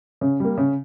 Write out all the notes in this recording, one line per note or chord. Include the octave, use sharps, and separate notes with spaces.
C#3
G3 A#3
C#3